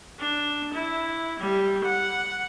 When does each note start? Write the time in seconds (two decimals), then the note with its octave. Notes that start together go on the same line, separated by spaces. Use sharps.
0.20 D4
0.73 E4
1.39 G3
1.84 F#5